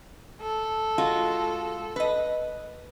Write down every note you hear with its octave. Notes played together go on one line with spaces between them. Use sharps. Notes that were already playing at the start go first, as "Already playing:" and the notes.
A4
G#3 F4 F#4
B4 D#5